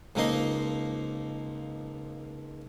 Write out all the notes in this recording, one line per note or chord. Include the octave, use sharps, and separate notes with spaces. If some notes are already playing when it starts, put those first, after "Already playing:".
C#2 F3 A#3 D#4 D#5 C6